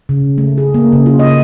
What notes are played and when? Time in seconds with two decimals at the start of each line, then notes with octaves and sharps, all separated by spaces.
0.09 C#3
0.38 A3
0.58 G#4
0.74 A#3
0.92 C#3
1.06 F4
1.19 D#5